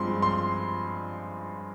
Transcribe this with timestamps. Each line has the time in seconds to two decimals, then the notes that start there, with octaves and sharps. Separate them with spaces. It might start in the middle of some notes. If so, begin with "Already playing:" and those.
Already playing: G2 F3 G#3 C4 C6
0.22 C6